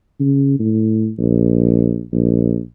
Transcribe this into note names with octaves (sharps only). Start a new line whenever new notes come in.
C#3
A2
A#1
A#1